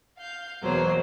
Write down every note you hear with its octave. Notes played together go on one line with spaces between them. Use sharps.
F5 G6
E2 B2 F#3 A#3 C5